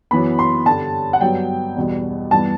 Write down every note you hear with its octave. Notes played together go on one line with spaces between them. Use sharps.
F#2 E3 B3 B5
C6
G2 D3 G3 A5
F#5
G2 F#3 B3 G5
E2 B2 G3
G2 E3 G3 B3 A5